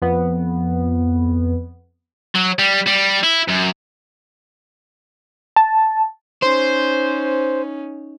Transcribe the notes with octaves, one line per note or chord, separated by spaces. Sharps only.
F2 B3
F#3
G3
G3
E4
F#2
A5
C#4 D#4 C5